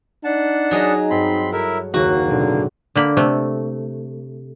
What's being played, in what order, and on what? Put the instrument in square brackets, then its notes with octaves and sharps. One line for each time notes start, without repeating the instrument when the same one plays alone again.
[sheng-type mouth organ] D4 F#5 A5 [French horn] D#4
[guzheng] F#3 G#4 D#5
[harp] G2 [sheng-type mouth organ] C4 B5 C6
[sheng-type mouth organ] E4 A#4 E5 [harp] F#4 A4 C#5
[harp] F#1 D#2 [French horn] F#3 [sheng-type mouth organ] A#3 [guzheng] F#4
[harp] A1 B2 C4 [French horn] D3
[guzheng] D3 A#3 B5
C3 A3